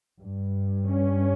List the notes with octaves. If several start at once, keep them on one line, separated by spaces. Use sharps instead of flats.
G2
C#4